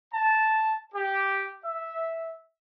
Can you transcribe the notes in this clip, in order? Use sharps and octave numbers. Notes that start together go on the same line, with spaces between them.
A5
G4
E5